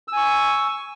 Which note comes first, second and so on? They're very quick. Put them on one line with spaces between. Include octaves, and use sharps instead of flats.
E6 G#5 C#6